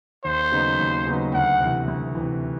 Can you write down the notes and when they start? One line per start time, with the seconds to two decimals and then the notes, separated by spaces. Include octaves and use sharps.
0.24 D#2 C5
0.52 C#3 F#3 B3 D#4
0.79 D#2
1.06 C#3 F#3 B3 D#4
1.34 D2 F#5
1.61 C3 E3
1.88 D2
2.15 C3 E3